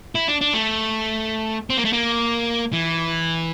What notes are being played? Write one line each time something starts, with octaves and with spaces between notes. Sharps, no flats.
E4
D4
D4
A3
C4
A#3
A3
A#3
E3